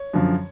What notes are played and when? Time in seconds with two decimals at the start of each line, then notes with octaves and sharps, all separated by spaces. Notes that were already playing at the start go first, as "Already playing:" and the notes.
Already playing: C#5
0.13 F#2 D3 F3